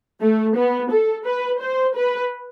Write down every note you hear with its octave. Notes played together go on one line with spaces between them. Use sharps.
A3
B3
A4
B4
C5
B4